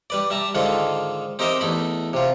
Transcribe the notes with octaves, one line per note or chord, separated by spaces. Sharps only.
G3 B4 D5
G3 E5 A5 A#5
G#2 D3 D#3 F4 A4
C4 D#4 G4 A#4 D#5 E5
E2 A3 D#4 B5
C3 F4